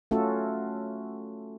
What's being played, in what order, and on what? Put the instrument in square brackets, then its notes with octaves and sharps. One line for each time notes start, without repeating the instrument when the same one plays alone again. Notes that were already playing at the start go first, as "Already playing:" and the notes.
[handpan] A3 C#4 F4 F#4 A4